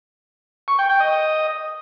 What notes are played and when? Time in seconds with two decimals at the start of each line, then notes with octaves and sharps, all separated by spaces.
0.68 C#6
0.79 G5
0.89 G5
1.00 D#5